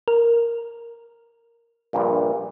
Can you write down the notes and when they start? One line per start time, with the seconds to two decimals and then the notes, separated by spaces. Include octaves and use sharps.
0.08 A#4
1.93 A#1 G2 A#2